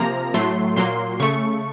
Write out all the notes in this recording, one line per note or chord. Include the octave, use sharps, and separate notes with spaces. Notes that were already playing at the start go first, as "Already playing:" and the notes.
Already playing: C3 F3 A#3 A#5
A2 F#3 A3 C6
A#2 F#3 A#3 C6
C#3 A3 C#6